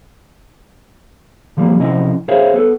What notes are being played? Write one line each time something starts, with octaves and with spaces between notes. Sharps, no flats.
D3 F3 G3 A3 A#3
C3 F3 C#4 E4 D#5
G#4 A#4 C5 C#5 E5 F5
B3 A4